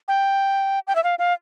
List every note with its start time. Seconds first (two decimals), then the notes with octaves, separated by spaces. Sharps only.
0.08 G5
0.87 G5
0.95 E5
1.04 F5
1.19 F5